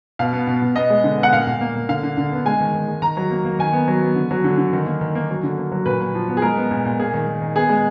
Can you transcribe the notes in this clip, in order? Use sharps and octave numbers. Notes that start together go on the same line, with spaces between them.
B2 F5
B3
B2
B2
B3 D#5
G#3
D3
B3
F#5
A#2 F5
A#2
A#3
A#3
D3 F5
D3
D3
B3
G#3 G#5
D#3
D#3
G#3
D#3 A#5
F#3
A#3
A#3
D#3 G#5
B3
F#3
B3
D3
F#3
D3
D3
D#3
A#3
D#3
A#3
F#3
D3
A#3
F#3
A#2 B4
A#2
F3
B3
G#4
G#3 A#4
B3
A#2
A#2
A#3 G#4
D#3
D#3
D#3
B3 G#4
G#3